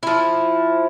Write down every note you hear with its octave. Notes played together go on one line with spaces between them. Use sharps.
F3 E4